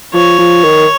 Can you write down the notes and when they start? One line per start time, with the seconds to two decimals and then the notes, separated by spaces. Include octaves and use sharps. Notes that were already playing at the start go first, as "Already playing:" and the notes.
0.14 F3 C#5
0.39 F3
0.64 D#3